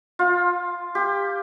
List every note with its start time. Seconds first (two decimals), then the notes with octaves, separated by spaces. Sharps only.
0.19 F4
0.95 G4